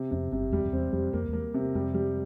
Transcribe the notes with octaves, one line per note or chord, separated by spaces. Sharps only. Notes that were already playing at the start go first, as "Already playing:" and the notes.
Already playing: C3
F2 C3
G1 G2 C3
E2 G3
F2
E2 C4
F2 G3
F2 A#3
E2 A#3
C3
F2 G3
G3